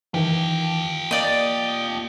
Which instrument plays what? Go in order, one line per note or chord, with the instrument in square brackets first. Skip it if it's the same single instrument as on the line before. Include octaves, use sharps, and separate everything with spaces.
[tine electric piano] D#3 E3 [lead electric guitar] F4 G4
[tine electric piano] A#3 [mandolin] D5 D#5